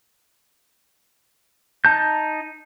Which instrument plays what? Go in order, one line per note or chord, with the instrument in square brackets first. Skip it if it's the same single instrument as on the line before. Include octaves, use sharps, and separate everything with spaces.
[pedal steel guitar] D#4 A5 G6